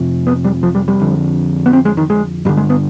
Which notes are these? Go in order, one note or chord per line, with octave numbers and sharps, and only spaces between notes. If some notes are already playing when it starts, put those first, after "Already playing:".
Already playing: F2 C3
B3
G3
F3
G3
G3
F2 D3
B3
C4
G#3
D#3
G#3
G2 D3 G3
G#3
B3